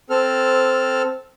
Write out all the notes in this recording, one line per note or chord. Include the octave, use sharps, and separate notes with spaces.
C4 A4 F6